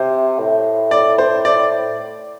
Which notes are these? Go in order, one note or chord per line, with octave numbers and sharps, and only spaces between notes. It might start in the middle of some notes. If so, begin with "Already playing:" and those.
Already playing: C3 C5
A2
D5
C5
D5